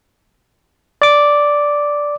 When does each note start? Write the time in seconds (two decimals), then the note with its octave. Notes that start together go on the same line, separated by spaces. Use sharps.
1.02 D5 D6